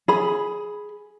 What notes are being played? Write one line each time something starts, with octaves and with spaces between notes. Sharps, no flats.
G#4 B5